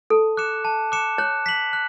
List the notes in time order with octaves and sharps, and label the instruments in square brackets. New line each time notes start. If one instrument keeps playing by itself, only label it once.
[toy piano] A4 [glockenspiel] A5
[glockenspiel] D6 F#6 C#7 E7
A5
D6 F#6 C#7 E7
[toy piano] C#5 [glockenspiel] F#6
[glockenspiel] B6 F#7
F#6